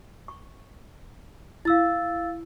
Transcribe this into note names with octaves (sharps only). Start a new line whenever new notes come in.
C#6
E4 F5 E6 A6